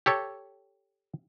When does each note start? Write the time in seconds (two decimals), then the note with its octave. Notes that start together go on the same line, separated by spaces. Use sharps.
0.06 G4 A4 C#5